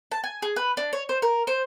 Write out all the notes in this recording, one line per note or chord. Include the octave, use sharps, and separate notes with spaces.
A5
G#5
G#4
B4
D4
C#5
C5
A#4
C5